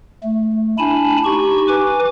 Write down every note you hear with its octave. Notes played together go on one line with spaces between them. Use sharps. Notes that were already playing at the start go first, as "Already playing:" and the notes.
A3
D4 E4 G#5 A5 B5
D#4 G4 C#6
B4 G#5 D6